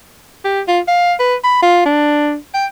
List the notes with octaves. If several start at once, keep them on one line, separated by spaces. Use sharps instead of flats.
G4
F4
F5
B4
B5
F4
D4
G5